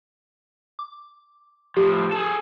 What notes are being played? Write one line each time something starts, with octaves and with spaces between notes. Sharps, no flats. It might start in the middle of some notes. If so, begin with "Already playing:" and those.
D6
A2 F3 G4
G#4 A4